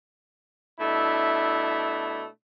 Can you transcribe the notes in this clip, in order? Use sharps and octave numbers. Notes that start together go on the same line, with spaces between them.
B2 A3 D4 E4